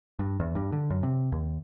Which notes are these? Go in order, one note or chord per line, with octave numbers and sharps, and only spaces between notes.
G2
E2
G2
D3
F#2
C3
D#2